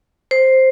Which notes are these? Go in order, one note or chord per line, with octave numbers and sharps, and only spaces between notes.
C5